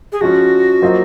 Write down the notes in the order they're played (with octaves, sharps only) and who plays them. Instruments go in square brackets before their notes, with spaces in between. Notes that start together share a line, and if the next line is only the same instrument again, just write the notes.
[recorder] G#4
[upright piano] F3 G#3 C#4 [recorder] F#4
[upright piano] F#3 A#3 F4 C5 D#5